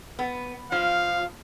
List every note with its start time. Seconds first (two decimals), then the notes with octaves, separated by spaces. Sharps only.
0.19 B3
0.72 F3 F5